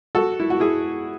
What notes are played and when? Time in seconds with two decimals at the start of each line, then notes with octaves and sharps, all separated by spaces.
0.15 F#4 A4
0.40 E4
0.50 F#4
0.60 E4 G#4